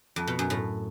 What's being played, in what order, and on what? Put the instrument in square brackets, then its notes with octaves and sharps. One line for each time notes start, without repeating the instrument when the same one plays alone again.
[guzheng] F2
B2
F#2
A2